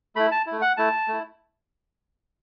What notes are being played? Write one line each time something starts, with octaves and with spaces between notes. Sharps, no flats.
A3 E4 B5
A5
E4
A3
F#5
A3 E4 A5
A3 E4